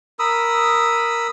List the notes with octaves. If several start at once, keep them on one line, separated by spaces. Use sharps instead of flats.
A#4 B5 D#6 E6